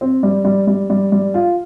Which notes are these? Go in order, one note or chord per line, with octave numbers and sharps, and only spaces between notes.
C4
G3
G3
G3
G3
G3
F4